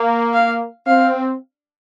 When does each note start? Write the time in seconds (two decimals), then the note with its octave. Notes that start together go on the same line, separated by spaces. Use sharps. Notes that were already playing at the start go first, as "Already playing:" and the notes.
Already playing: A#3
0.33 F5
0.86 C4 F5